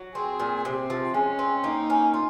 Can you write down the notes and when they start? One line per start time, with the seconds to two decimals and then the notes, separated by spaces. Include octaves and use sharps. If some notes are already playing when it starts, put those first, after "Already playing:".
Already playing: F#3
0.15 C4 G#4
0.40 A#2
0.64 C3 C4
0.90 F3
1.14 G#3 C#4
1.39 C4
1.64 A#3 D#4
1.90 C#4
2.14 F4